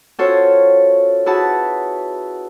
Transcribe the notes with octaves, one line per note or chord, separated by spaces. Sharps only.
C#4 F4 F#4 A4 C5 C#5
E4 F#4 G#4 B4 A5